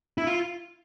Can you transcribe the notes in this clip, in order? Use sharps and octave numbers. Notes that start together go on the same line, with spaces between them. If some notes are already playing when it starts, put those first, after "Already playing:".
E4
F4